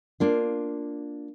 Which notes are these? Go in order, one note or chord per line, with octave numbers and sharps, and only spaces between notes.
A#3 D4 F4